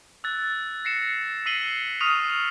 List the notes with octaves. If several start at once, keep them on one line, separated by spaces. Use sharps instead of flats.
E6 F#6 A6
A#6 C7 C#7 E7
E6 B6 C7 D#7 F#7 G7
C#6 D#6 F6 B6 D#7 F7